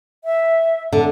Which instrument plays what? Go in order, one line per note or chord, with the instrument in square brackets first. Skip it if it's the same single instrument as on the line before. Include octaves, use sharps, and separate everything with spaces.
[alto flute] E5
[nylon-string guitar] D3